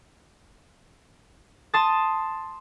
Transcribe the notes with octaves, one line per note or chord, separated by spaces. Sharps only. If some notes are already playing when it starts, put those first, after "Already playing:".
A5 C6 D#6 A6